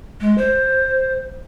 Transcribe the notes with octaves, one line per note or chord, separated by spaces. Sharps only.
G#3
C5